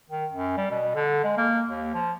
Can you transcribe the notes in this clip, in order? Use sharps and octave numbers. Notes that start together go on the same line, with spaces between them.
D#3
F#2
G3
B2
D3
G#3
A#3
D#2
F3